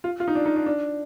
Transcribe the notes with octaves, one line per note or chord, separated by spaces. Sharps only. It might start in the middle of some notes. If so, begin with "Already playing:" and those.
F4
F4
D#4
D4
D#4
D4
D4